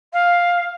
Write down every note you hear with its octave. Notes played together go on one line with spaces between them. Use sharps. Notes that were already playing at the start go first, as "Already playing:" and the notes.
F5